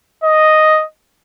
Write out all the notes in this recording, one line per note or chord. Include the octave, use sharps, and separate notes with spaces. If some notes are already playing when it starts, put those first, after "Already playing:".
D#5